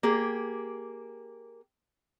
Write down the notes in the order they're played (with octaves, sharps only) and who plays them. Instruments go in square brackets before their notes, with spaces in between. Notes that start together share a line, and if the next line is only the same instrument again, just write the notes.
[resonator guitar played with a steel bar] A#3 G4 G#4